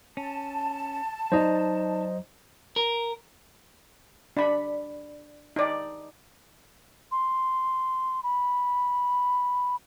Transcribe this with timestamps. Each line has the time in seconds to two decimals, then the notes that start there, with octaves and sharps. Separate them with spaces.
0.17 C#4 A5
1.32 F#3 D#4 C5 D5 D#5 A#5
2.76 A#4
4.37 D4 B5
5.56 D#4 D5
7.11 C6
8.23 B5